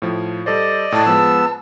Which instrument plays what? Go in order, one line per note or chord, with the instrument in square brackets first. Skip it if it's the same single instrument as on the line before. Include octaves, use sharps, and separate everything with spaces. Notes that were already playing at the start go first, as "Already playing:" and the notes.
[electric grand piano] A2 F3
[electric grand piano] G3 A4 C5 [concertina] D5 D#5
[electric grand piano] A2 D#6 [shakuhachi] A5
[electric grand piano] F3 G#3 [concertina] B3 E6